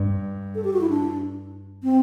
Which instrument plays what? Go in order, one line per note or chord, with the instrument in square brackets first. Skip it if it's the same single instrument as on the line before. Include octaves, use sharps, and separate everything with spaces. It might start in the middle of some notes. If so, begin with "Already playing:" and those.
Already playing: [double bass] G2
[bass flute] A4
G4
F#4
E4
D4
C4